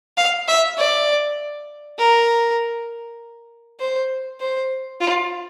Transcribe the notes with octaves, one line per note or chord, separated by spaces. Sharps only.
F5
E5
D5
A#4
C5
C5
F4